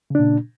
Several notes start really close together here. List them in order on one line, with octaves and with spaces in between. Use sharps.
C#3 D4 A#2